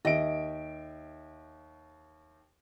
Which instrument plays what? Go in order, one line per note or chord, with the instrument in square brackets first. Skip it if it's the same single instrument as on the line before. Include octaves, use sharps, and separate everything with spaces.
[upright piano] D#2 E5 D7 [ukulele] D#5